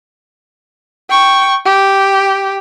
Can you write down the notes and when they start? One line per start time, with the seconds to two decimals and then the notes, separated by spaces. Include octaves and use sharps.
1.10 G5 C#6
1.66 G4